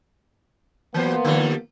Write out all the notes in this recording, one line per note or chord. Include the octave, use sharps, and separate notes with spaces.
E3 F#3 A#3 B3 C5
D3 F3 G3